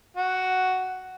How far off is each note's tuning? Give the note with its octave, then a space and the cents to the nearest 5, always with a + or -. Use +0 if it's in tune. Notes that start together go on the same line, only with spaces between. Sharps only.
F#4 +5